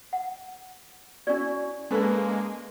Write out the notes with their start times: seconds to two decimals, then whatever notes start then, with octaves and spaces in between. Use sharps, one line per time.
0.13 F#5
1.27 C#4 E4 F#4 D5
1.91 G#3 A#3 C#4 A4 B4